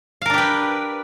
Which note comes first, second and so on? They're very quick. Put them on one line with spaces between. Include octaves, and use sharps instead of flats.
F5 A#4 D4 G4 B4